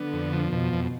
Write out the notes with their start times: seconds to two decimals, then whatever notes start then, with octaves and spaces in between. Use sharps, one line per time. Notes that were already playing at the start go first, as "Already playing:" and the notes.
Already playing: D3 B3
0.13 F2
0.33 F3
0.52 F2 B2
0.73 F2